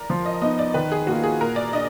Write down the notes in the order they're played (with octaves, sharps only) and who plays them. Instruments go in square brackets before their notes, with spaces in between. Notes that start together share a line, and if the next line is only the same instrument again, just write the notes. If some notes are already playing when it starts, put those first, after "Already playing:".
Already playing: [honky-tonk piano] A#4 D5
[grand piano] F3
[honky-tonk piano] D#5
[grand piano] B3 D#4 [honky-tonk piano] D#5
[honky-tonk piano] D5
[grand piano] D#3 [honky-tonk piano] B4
[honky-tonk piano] G#4
[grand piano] A#3 F4 [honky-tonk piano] F#4
[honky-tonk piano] G#4
[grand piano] A#2 [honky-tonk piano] A#4
[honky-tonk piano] D5
[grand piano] D4 [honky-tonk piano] D#5